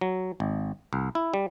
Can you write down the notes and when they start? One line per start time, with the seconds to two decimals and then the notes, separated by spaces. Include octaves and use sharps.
0.01 F#3
0.40 G#1
0.93 C2
1.15 E4
1.34 G3